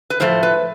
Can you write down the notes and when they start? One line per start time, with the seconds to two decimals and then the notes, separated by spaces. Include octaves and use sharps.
0.10 B4
0.20 A2 F3 A3 C5
0.43 B4